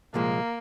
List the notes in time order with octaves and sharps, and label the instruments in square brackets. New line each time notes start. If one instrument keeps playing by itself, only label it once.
[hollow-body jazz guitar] C2 A#2 F3 G#3 [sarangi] A#3